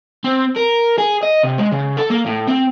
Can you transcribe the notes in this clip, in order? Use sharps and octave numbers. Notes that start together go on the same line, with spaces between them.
C4
A#4
G#4
D#5
C3
G#3
C#3
A4
A#3
A2
C4